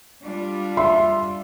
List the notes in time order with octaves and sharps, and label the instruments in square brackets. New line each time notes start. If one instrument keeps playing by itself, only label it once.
[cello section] G3 D4 F4
[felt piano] E5 C6